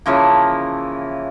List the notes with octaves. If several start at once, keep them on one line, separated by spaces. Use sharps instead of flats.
C#3 E3 F3 A#3